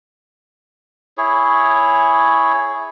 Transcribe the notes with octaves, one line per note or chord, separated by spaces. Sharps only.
E4 G#4 C#5